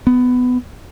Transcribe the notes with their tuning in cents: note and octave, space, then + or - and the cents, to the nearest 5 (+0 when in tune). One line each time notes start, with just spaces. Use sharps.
B3 +15